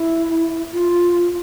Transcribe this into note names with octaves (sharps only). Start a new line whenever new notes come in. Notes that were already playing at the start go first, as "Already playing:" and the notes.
Already playing: E4
F4